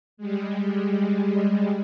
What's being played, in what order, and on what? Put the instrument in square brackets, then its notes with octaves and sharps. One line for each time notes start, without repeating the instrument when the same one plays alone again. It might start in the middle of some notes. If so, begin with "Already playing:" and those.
[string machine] G3 G#3